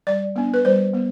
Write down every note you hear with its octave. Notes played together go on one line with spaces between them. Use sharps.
G3 D5
B3 D4
B4
G3 C5
B3